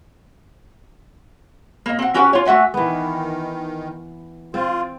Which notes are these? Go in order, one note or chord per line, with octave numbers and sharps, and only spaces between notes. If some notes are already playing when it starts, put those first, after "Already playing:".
A#3 D#5
C4 F#5
C#4 F#4 G4 B4 F#5
F4 C#5
A3 F#4 E5 F#5 G#5
D#3 E3 B3
C4 F4